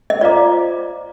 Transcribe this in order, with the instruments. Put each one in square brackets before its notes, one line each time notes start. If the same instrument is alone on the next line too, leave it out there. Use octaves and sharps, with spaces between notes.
[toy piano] D#5
[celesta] F4 C5 F5 A#5 D6 [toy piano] D5